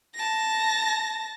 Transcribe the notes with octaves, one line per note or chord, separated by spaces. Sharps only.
A5 A#6